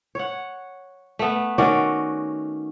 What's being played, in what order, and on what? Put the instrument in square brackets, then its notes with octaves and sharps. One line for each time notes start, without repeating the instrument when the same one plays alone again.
[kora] C#5 F#5
A3 B3
D#3 C#4 F#4 D5